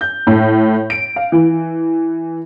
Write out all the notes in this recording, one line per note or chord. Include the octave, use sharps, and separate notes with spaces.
G6
A2
D7
F5
E3